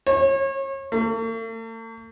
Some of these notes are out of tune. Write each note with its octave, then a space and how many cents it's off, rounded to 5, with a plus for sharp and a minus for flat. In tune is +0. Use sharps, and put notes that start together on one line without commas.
C#5 -35
A3 +45